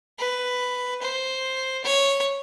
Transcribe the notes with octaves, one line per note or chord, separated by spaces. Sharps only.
B4
C5
C#5